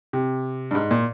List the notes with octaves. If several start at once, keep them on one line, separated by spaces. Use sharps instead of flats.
C3
G2
G#2
A#2